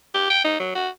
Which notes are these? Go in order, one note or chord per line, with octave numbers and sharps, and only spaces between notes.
G4
G5
D#4
F#3
F#4